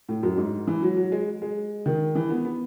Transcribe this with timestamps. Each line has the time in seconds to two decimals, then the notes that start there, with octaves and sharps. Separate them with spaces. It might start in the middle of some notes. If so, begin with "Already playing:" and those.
0.09 A2
0.23 F#2
0.37 G#2
0.67 E3
0.82 F#3
0.96 F#3
1.12 G#3
1.42 G#3
1.86 D#3
2.15 E3
2.30 B3
2.45 B3